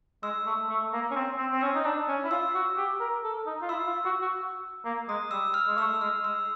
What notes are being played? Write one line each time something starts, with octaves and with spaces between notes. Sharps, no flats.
G#3 E6
A3
A3
A#3
C#4
C4
C4
C4
C#4 E6
D#4
D4
C#4
E4
F4 E6
F#4
G4
A#4
A4
D#4
F4
E4 E6
F4
F#4
F#4
A#3
G#3 D#6
G3 E6
F6
G#3
A3 E6
G#3 F6
G#3 E6